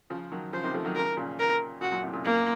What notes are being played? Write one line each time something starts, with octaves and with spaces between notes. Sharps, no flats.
C#3 F3
D#3 F#3
C#3 F3 C5
C3 D#3
F3 A3
D#3 F#3
C#3 F3 A#4
A#2 C#3
A#4
A#2 C#3 F#4
F#2 A#2
A2 C3
A#2 C#3
A#3